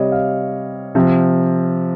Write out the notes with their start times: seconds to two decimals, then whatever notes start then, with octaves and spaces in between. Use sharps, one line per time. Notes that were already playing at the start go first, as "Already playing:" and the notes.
Already playing: C3 G3 C#5 D#5
0.12 F5
0.95 C3 F3